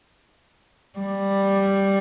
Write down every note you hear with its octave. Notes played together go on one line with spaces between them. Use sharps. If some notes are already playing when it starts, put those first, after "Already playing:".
G3